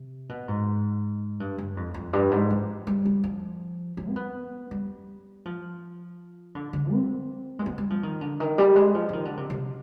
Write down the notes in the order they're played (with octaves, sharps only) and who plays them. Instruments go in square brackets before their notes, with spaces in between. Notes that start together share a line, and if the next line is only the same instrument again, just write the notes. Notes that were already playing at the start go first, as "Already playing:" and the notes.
Already playing: [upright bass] C3
B2
G#2
G2
G2
F2
F2
G2
G#2
F3
G3
G3
F3
F3
C4
B3
G3
F3
D3
D3
C4
G#3
B3
G3
F3
D#3
D3
D#3
G3
G#3
F3
F3
D#3
D3
C3
C3